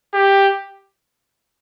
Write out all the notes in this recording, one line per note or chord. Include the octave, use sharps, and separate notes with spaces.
G4